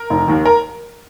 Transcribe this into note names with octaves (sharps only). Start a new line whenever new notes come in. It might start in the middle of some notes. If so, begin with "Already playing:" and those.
Already playing: A#4
F1
D#2 D#3
A#4